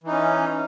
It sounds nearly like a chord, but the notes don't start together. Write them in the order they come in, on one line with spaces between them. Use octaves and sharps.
E3 D#4 C#4